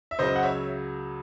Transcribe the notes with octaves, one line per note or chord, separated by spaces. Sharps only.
E5
C#2 C#3 F#3 C5 D#5
F#5
C#5 E5